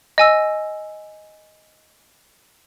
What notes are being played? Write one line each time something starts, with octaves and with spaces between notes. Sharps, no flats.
D#5 G#5 E6